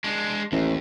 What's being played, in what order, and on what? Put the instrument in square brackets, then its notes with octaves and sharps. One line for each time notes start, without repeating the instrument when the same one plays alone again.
[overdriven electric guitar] G#3 D4
[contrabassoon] A1 [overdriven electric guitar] D#2